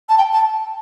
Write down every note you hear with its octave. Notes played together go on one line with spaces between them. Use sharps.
A5
G5
A5